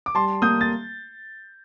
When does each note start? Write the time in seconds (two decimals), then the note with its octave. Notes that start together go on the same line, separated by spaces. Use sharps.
0.06 D6
0.15 G3 A5 C6
0.42 A#3 D#6 G6
0.61 A6